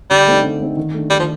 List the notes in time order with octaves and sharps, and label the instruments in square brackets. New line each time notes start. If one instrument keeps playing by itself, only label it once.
[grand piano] D3 [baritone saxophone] G3
[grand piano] A3 C4 D#4
D3
A3 C4 D#4
D#3
A3 D4
[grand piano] D#3 [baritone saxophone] G3
[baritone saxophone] F3